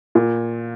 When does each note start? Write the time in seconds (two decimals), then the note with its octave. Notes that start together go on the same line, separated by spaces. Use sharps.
0.15 A#2